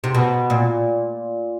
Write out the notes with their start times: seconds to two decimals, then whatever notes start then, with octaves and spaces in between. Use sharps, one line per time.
0.04 C3
0.14 B2
0.50 A#2